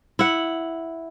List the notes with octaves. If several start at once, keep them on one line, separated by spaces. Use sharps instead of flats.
E4 F#5